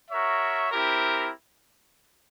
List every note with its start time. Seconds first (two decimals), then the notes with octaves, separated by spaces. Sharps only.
0.10 F#4 A#4 C#5 E5
0.70 C4 E4 G4 A#4